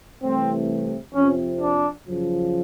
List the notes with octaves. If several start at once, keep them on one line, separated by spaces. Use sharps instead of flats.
C2 C3 E3 A3 C4
F2 C3 F3 C#4
D4
F#2 C#3 F3